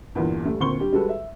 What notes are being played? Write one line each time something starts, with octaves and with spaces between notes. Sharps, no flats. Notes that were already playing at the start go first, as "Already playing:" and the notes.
A#1 E2 G2 A#2 D3 E3
G3 A3
D2 A#2 C4 C6 C#6 G7
D3 G3 G4
G3 G#3 F#4 A4 B4
E5